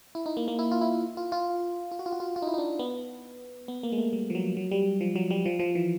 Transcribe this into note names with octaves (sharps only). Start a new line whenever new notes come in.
E4
D#4
A#3
A#3
E4
F4
E4
F4
F4
F4
F#4
F4
F#4
F4
F4
D#4
E4
D#4
D4
B3
B3
A#3
G#3
A3
G3
F3
F#3
F#3
G3
F3
F#3
G3
F3
F3
E3